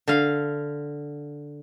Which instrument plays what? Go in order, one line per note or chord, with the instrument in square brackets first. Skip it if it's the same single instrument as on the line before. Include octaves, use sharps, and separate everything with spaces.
[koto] D3 F5